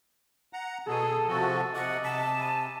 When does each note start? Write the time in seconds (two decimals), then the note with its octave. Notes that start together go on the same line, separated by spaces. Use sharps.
0.53 F#5 A#5
0.88 B2 G#4 A4 A#5 D#7
1.28 C3 F3 F#4 G#5 E6 A6
1.76 C3 D#5 F#5 D6 A#6
2.04 C3 A5 A#5 D6 B6
2.40 G#5 B5 D#7